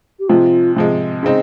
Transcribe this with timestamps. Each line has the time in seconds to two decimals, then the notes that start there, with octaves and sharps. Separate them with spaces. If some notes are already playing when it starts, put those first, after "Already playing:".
0.19 G4
0.28 C3 F3 G#3 F4
0.76 C3 F3 G#3
1.23 C#3 G#3 C4 D#4